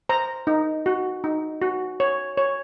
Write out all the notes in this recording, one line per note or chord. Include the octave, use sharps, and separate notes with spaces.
C5 A#5
D#4
F#4
D#4
F#4
C#5
C#5